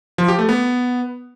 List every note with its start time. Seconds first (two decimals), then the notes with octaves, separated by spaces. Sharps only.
0.18 F3
0.28 G4
0.39 A3
0.49 B3